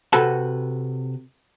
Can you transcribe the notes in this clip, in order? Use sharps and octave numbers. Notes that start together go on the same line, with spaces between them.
C3 F#4 A4 B4 A5